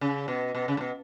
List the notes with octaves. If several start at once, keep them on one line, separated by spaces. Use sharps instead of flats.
C#3
B2
B2
C#3
A2
B2